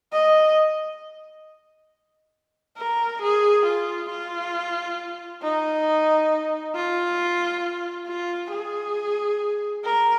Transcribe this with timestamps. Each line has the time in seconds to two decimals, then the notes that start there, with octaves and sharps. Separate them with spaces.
0.12 D#5
2.78 A#4
3.22 G#4
3.66 F4
4.10 F4
5.43 D#4
6.75 F4
8.08 F4
8.52 G#4
9.85 A#4